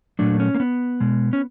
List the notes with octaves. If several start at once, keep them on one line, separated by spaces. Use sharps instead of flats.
A#2 F#3 A3 D4
C#4
A#3
B3
B2 G#3
C#4